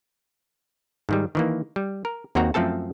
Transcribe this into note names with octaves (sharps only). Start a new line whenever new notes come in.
G#2 D#3 G3
D#3 E3 A#3
G3
A#4
D#2 A#3 C4 F#4 F#5 A#5
F#2 F3 A3 C4 A4 A5